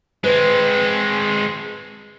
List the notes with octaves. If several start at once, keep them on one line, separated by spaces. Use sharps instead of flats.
G#3 C4 B4 C5